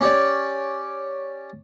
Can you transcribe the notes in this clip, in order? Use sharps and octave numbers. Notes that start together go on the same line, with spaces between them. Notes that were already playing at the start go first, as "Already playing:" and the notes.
C#4 G4 C#5 D5